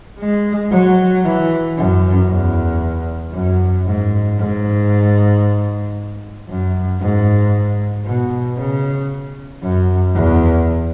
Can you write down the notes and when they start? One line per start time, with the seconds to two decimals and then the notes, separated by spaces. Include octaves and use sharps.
0.20 G#3
0.72 F#3
1.25 E3
1.77 F#2
2.29 E2
3.34 F#2
3.86 G#2
4.39 G#2
6.49 F#2
7.01 G#2
8.05 B2
8.59 C#3
9.63 F#2
10.15 E2